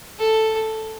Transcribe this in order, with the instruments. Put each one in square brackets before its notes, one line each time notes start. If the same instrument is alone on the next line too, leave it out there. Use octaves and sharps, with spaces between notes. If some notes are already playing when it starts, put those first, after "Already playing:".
[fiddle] A4